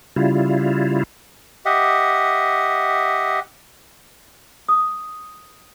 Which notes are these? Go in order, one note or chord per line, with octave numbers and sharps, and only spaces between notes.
C#3 G3 E4 F4
G4 D#5 E5 F#5
D#6